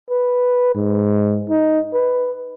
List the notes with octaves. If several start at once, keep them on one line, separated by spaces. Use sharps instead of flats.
B4
G#2
D#4
B4